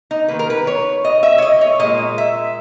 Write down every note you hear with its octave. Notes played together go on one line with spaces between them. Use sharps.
D#4
D#3 A#3 B4
A#4
B4
C#5
D#5
E5
C#5
D#5
C#5
A#2 G#3 D#5
E5